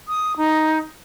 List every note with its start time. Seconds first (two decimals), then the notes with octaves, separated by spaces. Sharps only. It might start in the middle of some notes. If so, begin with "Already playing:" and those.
0.08 D#6
0.37 D#4